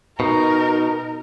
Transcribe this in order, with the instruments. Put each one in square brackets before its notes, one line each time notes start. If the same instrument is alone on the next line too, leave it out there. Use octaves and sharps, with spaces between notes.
[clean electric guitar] B2 [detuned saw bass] D#4 [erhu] A#4